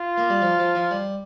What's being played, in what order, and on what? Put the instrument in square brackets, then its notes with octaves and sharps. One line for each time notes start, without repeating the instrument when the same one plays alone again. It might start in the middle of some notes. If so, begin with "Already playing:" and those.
Already playing: [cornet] F4
[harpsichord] A#3
G3
F3
F3
F3
G3